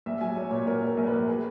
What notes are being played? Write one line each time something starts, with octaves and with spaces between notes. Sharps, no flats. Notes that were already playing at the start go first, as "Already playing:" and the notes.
A#1 E5
F#3 G#5
A#1 C#5
A#2 C#5
A#2 A#4
A#1 A#4
A#1
B4
A#1
G#4